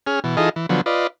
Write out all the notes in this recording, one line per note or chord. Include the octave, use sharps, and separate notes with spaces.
C#4 G#4 F6
B2 E3
E3 D#4 F4 G#4 A4 D#5
E3
D3 F3 F#3 B3
F4 B4 D5 D#5